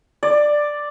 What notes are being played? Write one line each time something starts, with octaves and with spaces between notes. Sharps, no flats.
D5